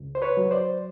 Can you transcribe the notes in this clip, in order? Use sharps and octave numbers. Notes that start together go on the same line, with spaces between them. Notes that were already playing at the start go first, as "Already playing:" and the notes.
Already playing: C#2
C5
B4 C#5
F#3
C5 D5